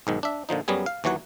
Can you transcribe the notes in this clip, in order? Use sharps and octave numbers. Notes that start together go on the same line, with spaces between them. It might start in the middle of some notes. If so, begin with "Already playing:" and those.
B1 G#2 D#3
D4 E5
A#2 D3 F3 D#4
F#2 F#3 G3 B3 G#4
F5
D#2 E3 F#3 C#5 F#5